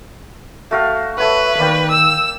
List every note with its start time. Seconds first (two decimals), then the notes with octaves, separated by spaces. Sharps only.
0.71 A3 F#4 F5
1.18 A4 B4 C#5 E5 F#5
1.58 D#3 A#3 D5 G5
1.90 E6